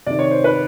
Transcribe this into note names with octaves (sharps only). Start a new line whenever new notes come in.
C3 D#3 D5
C#5
C5
B4